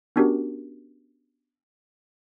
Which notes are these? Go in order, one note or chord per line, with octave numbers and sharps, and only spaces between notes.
B3 C#4 D4 F#4 G4 A#4